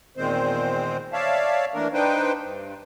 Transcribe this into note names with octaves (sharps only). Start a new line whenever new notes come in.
E2 A#2 D#3 G#3 C4 C5
C#5 D5 E5 F5 A5
E3 A3 A#3 D4 A#4
D4 D#4 B4 C5 G5
G2